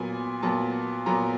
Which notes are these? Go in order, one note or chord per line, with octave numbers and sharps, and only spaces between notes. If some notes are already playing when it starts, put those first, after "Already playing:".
Already playing: A#2 F#3 B3 G#5
A#2 F#3 B3 A5
A#2 F#3 B3 A#5